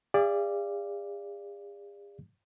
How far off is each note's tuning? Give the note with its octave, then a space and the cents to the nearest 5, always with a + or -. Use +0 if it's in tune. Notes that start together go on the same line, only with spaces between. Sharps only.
G#4 -45 D5 +0 F5 -30